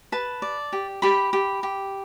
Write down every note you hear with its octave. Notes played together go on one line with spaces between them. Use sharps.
B4 A5
D5
G4
G4 B5
G4
G4